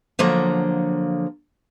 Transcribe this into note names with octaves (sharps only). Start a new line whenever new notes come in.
D3 F3 F#3 A#3 A#5